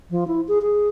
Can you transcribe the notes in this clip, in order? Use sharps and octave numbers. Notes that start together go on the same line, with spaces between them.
F3
E4
G#4
G#4